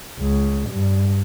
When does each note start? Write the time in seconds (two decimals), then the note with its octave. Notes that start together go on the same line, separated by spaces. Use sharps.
0.20 C#2
0.70 G2